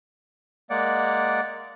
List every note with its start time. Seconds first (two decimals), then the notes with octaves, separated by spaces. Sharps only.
0.70 G#3 A#3 D5 F#5